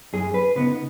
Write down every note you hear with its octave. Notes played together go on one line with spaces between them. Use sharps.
F#2 G#4
B4
C#3 B3 D#4 B4